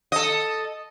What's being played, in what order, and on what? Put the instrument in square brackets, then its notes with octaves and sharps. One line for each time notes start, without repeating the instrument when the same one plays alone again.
[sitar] A4 D#5